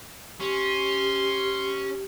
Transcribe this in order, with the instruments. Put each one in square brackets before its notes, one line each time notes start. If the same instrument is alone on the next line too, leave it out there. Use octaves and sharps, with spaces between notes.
[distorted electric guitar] C#4 [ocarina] G4 [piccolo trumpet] C6